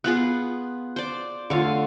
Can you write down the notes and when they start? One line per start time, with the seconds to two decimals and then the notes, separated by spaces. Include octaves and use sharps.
0.04 B3 F4 G#4 F#6
0.96 C5 D5
1.50 D3 A3 F4 C#5 F5